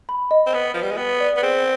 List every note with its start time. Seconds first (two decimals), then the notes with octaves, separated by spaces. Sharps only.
0.09 B5
0.31 D#5
0.46 C4
0.53 B3 B4
0.74 F3 B4
0.83 G3
0.91 G#3
0.98 B3 G5
1.20 D5
1.37 B3
1.42 C4 G#4